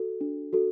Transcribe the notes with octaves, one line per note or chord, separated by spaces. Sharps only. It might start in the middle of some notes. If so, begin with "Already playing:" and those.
Already playing: F#4 A4
D4
F#4 A4